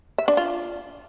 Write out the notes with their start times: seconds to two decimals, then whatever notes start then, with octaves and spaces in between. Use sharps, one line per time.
0.18 E5
0.28 D4
0.37 F4